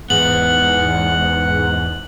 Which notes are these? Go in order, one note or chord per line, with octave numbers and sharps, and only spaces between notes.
E2 G#2 B3 F#5 F#7